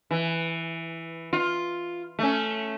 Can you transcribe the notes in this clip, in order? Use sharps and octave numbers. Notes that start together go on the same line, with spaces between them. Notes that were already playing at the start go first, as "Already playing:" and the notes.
E3
F4
A3 C#4